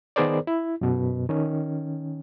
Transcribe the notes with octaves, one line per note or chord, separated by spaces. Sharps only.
D#3 B3 G#4 A#4 C5 D5
E4
F#2 B2
D#3 C#4